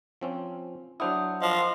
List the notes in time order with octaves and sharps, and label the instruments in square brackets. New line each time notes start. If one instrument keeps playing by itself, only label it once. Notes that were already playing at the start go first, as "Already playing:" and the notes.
[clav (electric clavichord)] F3 C4 C#4
[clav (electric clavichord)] F#3 D4 E4 [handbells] C5 F#5 D#6
[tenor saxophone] F3 [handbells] D#5